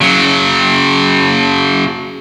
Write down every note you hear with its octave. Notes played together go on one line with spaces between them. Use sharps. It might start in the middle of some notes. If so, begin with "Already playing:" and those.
C#3 F#3